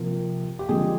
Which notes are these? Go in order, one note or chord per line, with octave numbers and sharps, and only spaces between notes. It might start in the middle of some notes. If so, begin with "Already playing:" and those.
Already playing: C3 F3 A#3
G4
D3 F3 G#3 C4 G#4